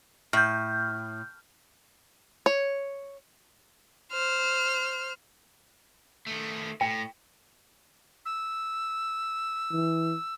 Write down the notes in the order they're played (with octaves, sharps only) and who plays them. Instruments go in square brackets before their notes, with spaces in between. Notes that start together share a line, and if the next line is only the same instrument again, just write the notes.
[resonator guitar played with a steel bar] A2 [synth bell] F6 G6
[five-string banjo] C#5
[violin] C5 F6
[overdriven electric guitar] D#3 A3
[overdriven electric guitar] A2 [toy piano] G5
[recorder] E6
[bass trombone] E3